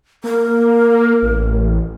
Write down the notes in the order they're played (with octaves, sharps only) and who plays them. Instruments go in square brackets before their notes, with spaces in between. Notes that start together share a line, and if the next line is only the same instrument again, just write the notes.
[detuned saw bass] A#3 [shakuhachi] A#4
[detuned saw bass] A1